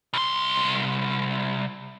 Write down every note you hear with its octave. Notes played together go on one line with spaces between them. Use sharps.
C2 C6